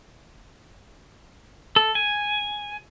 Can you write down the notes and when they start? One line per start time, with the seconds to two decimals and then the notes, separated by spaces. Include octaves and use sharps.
1.76 A4
1.95 G#5